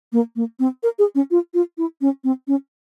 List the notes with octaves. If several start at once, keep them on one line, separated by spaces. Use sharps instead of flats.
A#3
A#3
C4
A#4
G#4
C#4
F4
F4
E4
C#4
C4
C#4